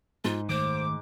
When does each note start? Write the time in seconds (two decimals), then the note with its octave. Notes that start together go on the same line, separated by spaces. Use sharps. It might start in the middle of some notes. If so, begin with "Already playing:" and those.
0.24 G#2 F4
0.49 D#3 A3 C5 D6